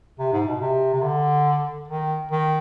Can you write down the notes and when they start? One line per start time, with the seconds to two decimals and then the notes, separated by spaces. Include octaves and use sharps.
0.19 C3
0.33 G#2
0.47 B2
0.61 C3
0.94 C3
1.03 D3
1.88 D#3
2.31 D#3